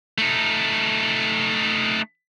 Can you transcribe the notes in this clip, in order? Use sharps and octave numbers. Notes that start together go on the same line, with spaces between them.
A3 D#4